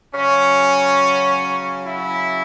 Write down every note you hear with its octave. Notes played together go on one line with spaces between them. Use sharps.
C#3 F#3 C#4
E4